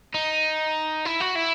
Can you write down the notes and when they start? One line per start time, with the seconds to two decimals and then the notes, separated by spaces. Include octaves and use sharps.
0.14 D#4
1.05 E4
1.20 F#4
1.35 E4